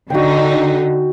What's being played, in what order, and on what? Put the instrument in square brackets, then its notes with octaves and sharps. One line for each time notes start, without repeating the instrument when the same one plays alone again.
[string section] D3 D#4 [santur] F#4 G5